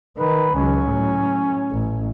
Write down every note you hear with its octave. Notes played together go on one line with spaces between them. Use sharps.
D#3 B4
C#2 F#3 C#4
A2 F#3
A1